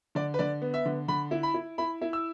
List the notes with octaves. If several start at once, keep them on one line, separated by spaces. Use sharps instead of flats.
D3 D5
B4
D3 D5
B3
E5
D3
D3 B5
E4
B5
E4
E4 B5
E4
E6